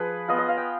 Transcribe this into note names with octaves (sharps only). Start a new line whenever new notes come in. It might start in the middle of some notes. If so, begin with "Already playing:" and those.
Already playing: F3 G#4 B4
B3 F4 D#5
D#5
F5
G5